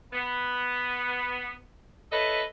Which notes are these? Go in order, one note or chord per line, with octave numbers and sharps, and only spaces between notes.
B3
E4 A4 B4 C#5 D#5